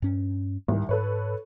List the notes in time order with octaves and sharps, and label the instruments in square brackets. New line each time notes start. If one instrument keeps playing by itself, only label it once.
[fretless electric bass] G2 C#4
[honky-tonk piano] C2 D#3 [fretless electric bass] G#2
[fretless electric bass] G#2 [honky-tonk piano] A4 B4 C#5